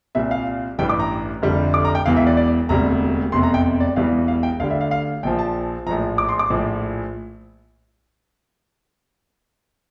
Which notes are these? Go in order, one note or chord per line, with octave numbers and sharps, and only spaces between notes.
C2 A#2 G3 E5
F5
A1 G2 E3 G3 G5
D6
A#5
F1 F2 D3 G3
D6
A#5
G5
E1 E2 E3 F5
E5
D5
D5
E1 D2 C3 G3 A#5
F1 E2 C3 C6
A#5
G5
D5
E1 E2 E3 G3 F5
F5
G5
D2 D3 G3 F5
E5
F5
F5
A#1 A#2 F3 G5
A5
A#1 A2 F3 A#5
D6
C6
D6
A#1 A2 F3